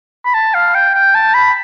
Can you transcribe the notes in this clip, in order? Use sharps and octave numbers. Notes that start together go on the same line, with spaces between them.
B5
A5
F5
G5
G5
A5
B5